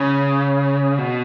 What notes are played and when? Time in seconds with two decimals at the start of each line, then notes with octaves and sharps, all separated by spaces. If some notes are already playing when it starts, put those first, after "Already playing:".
Already playing: C#3
0.98 B2